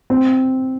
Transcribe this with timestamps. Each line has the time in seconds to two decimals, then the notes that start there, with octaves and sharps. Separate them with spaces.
0.10 C4